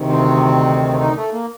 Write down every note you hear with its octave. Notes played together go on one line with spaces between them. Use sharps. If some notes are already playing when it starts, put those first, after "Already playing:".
Already playing: D2 C3 D#3
C4
D#4
A3
A#3